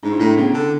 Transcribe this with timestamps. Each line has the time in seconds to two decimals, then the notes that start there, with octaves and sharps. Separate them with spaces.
0.03 G#2 D4
0.12 E4
0.19 A2 D4
0.37 C#3 B3
0.54 D3